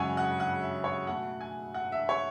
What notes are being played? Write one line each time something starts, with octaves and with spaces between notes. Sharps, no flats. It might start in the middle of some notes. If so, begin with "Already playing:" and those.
Already playing: F#2 C#3 G#3 C#5 F#5 G#5
F#5
F#5
E5
C#5
B2 A3 F#5
G#5
F#5
E5
C#5